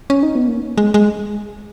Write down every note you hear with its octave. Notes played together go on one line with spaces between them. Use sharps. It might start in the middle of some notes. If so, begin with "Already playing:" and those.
C#4
D#4
B3
A#3
G#3
G#3